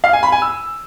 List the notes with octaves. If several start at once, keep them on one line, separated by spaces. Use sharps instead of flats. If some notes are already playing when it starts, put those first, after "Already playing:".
F5
G#5
B5
G#5
E6